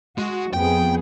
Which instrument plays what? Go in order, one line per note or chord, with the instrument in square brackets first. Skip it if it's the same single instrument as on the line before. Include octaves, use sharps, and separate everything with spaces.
[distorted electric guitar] G#3 [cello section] F#4
[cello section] F2 B3 G#4 [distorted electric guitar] G5